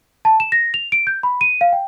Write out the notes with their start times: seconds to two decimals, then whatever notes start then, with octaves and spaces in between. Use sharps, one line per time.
0.25 A5
0.40 E7
0.52 A#6
0.74 F7
0.92 D7
1.07 G6
1.23 B5
1.41 D#7
1.61 F5
1.73 G5